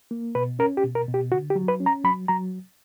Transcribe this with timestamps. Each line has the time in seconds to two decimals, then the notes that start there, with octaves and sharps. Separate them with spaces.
0.11 A#3
0.35 B2 B4
0.59 C#4 A#4
0.77 G4
0.84 B2
0.95 A#4
1.08 B2
1.14 G4
1.32 D3 F#4
1.50 G4
1.55 F#3
1.68 B4
1.80 C#4
1.86 A#5
2.04 F#3 B5
2.28 F#3 A#5